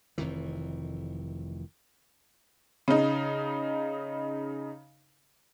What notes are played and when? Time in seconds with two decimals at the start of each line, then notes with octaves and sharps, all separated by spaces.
0.18 F1 F2 D#3 E3
2.88 C#3 D#4